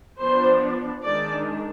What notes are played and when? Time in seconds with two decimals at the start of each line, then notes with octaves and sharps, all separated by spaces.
0.19 F3 B3 D4 C5
1.04 D#3 G#3 D4 D5